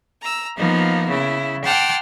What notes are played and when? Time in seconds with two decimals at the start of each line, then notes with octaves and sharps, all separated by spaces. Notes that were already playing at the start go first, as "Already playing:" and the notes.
0.22 A#5 E6
0.57 F3 A#3 B3 D#4
1.09 C#3 E4
1.64 F#5 G5 A5 C6 D6 F6